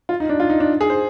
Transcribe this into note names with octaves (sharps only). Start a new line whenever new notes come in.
F4
D#4
D4
F4
D#4
D4
G#4
C5